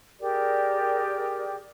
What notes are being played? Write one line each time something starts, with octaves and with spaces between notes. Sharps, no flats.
G4 G#4 A#4 D5